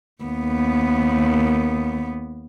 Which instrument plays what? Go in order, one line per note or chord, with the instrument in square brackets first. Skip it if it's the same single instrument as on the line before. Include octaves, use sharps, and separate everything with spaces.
[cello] D#2 B3